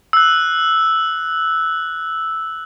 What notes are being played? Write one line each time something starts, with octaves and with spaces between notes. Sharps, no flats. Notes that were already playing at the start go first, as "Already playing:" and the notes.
E6 F#6